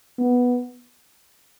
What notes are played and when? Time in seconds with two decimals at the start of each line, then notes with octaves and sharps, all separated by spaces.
0.18 B3